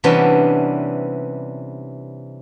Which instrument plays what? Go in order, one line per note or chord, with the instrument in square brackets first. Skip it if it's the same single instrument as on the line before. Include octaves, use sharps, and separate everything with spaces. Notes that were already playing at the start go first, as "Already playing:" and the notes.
[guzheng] C3 E3 G3 B3 C#4 D4